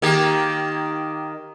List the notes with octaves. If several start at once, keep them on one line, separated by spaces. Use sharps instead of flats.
D#3 A#3 G4